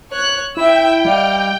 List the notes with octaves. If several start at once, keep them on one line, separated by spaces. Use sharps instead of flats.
C#5 F#6
E4 E5 G5 E6
G3 D#5 F5